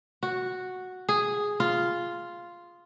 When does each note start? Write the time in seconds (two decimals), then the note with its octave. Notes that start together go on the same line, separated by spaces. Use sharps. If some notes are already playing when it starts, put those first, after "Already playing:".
0.23 F#4
1.09 G#4
1.60 F4